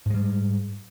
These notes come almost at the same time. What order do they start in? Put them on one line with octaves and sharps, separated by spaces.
G#2 G#3 G3